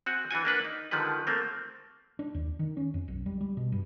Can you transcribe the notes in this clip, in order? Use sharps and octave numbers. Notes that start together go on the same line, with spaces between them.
C4 F#4 F#5 G#5
E3 D4 F#4 G#5
A#3 D4 B4 F#5
D#4
D3 D#3 F3 G3 G#3 B4
A3 A#3 C4
D4
D#2
D#3
C#4
F2
B1
G3
G3
B2
G2